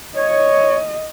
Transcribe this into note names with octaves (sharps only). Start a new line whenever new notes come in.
C#5 D#5